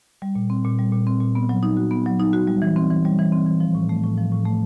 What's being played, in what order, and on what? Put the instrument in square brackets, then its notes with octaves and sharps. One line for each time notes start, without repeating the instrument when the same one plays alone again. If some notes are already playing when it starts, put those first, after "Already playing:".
[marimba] G3
A#2
C4
A#2
G3
A#2
C4
A#2
B3
F#3
D#4
F#4
B3
F#3
D#4
F#4
G3
E3
C4
E3
G3
E3
C4
E3
F3
A2
A3
A2
F3
A2
A3